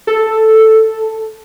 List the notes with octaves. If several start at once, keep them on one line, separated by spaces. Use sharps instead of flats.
A4